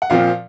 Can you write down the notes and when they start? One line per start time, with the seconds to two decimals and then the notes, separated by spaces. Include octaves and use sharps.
0.02 F#5
0.10 A#2 F3 C4 F5